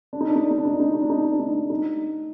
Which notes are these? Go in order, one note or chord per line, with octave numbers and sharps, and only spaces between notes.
D4
D#4
D4
D#4
D4
D#4
D4
D#4
D4
D#4
D4
D#4
D4
D#4
D4
D#4
D4
D#4
D4
D#4